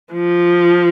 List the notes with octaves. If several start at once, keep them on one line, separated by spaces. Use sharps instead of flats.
F3